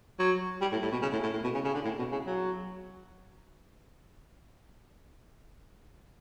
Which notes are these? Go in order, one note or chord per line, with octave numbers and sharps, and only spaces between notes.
F#3
G3
A2
A2
B2
C#3
A2
A2
A2
B2
C#3
C#3
D3
A2
B2
C#3
F#3